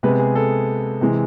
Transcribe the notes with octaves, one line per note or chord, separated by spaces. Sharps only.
C3 G#3 B3 B4
G#4
A4
C3 E3 G#3